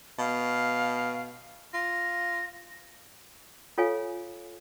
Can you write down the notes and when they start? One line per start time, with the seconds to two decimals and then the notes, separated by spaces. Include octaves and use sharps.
0.19 B2 F5
1.74 F4 A#6
3.78 F4 A4 C#5 F5 G#5